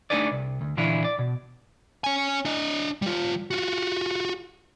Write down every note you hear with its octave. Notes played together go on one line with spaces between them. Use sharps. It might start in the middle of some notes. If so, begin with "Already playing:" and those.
A3 D4 D#4 G#4 B4 D5
C2
D2
A#2 D3 E3 D4 E4 F4
D5
B2
C#4 G#5
D4 D#5
G3 F4
F4 F#4